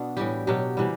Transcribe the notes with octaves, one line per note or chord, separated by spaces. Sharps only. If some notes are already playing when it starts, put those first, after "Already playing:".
Already playing: B2 B3 D4
A2 E3 G3 G4
B2 F#3 G4
C3 E3 G3